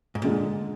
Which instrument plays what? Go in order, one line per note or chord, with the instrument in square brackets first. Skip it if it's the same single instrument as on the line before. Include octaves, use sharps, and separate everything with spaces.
[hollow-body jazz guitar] G#2
[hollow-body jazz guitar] A#2 [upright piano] D3 G#3